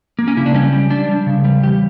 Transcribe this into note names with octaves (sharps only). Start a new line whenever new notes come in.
A#3
C#4
C#3 E4
D4
G3 C#4
G3
G3 D4
G3
C#3
G3
E2 G4